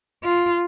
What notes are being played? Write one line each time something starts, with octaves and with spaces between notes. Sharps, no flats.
F4